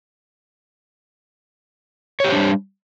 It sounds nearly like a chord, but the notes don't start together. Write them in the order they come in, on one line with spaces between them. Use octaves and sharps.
C#5 G4 C5 D4 G3